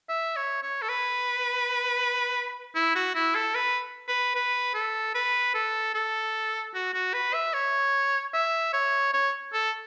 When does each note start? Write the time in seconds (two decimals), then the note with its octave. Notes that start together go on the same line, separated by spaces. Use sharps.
0.09 E5
0.36 C#5
0.62 C#5
0.82 A4
0.89 B4
2.75 E4
2.95 F#4
3.15 E4
3.35 A4
3.55 B4
4.08 B4
4.35 B4
4.74 A4
5.14 B4
5.54 A4
5.94 A4
6.74 F#4
6.94 F#4
7.13 B4
7.34 E5
7.53 C#5
8.34 E5
8.73 C#5
9.13 C#5
9.53 A4